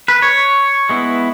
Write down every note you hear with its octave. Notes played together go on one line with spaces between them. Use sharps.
B4
C#5
G#3 B3 E4